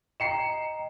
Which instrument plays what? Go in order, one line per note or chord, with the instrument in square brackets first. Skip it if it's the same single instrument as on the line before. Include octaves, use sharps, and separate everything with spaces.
[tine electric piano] D#5 G5 A#5 [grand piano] C7 C#7 E7